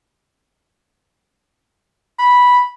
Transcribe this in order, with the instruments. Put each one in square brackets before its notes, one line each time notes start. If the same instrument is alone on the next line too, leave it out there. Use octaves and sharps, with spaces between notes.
[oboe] B5